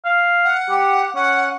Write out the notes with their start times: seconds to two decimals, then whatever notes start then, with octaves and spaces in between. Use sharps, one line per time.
0.05 F5
0.45 F#5
0.70 G4
1.15 C#4 F#5